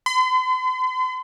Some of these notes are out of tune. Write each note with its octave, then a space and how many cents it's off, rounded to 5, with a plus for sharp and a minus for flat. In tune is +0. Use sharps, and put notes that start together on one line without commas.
C6 -45